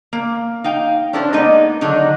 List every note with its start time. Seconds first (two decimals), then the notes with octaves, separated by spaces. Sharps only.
0.13 A#3
0.64 D#4 F5 G5
1.13 C#4 D4 E4 A4 C5
1.33 G#3 A#3 B3 D#4 D5 D#5
1.81 D3 D#3 F#3 D4 D#4